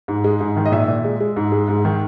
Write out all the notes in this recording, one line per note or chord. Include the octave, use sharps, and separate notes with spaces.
G#2
G#3
G#2
D#3
D#5
A#2 E5
A#2
G#3
G#3
G#2
G#3
G#2
D#3